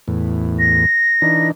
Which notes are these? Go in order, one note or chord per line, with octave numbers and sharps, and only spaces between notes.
E2 A2
A#6
E3 D4 D#4